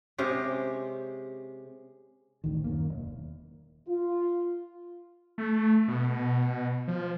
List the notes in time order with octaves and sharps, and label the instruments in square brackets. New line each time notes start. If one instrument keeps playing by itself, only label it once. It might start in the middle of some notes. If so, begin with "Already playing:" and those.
[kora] C3 G#3 C#4 G4
[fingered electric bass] A1 D2 D#3
F#2 D#3 A#3
E1
[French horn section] F4
[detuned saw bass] A3
B2
F3